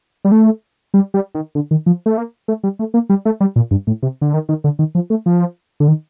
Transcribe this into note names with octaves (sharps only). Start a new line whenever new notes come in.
G3
A3
G3
G3
D#3
D3
D#3
F3
A3
A#3
A3
G3
A3
A#3
G3
A3
G3
A#2
G2
A2
C3
D3
D#3
D#3
D3
D#3
F3
A3
F3
D3
D#3